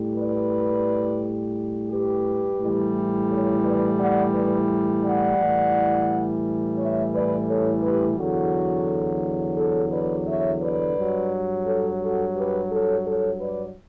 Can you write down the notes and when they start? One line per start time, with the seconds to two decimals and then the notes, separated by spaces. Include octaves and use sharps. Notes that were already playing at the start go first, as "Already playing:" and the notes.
Already playing: A2 G3
0.15 B4 D5
1.90 G4 B4
2.60 A2 E3 G3
3.30 A4 C#5
3.64 B4 D5
3.99 D5 F#5
4.34 B4 D5
5.03 D5 F#5
5.39 A2 E3 G3
6.78 C#5 E5
7.13 B4 D5
7.48 A4 C#5
7.82 G4 B4
8.18 E2 D3 F#3 F#4 A4
9.57 A4 C#5
9.92 B4 D5
10.27 C#5 E5
10.62 B4 D5
10.97 G2 F#3
11.66 A4 C#5
12.01 F#4 A4
12.36 G4 B4
12.71 A4 C#5
13.06 A4 C#5
13.40 B4 D5